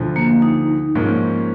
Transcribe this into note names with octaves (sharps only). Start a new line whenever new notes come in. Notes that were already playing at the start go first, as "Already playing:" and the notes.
Already playing: D2 D3 F3
A#3
D#4
G#2 F3 A#3 C#4